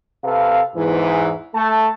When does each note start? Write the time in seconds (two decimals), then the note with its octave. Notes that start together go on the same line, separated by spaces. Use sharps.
0.24 C3 A4 B4 F5
0.76 E2 G#2 E3
1.55 A3 A5